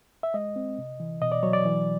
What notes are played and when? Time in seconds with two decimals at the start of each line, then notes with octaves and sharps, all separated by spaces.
0.23 E5
0.34 G#3 D#5
0.56 C4
0.78 C3
1.00 E3
1.22 B2 D#5
1.32 D5
1.43 F#3 C#5
1.53 D5
1.65 E3